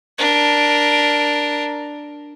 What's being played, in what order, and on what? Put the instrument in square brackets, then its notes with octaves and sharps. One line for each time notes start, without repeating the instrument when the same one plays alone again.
[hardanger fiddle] D4 A#4